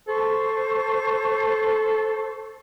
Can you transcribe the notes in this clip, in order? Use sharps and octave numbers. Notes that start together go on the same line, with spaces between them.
A4 C5 C#6